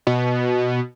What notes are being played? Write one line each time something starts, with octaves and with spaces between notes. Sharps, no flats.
B2